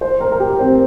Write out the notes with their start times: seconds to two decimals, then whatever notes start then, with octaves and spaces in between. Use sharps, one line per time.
0.01 C5
0.20 A#4
0.31 A#4
0.40 G4
0.59 C4